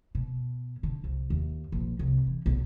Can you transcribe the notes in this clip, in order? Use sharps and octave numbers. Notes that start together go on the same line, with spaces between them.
B2
D3
C2
D#2
A#1
C2
E3
B1